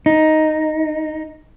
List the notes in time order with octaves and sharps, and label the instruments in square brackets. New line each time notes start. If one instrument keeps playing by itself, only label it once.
[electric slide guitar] D#4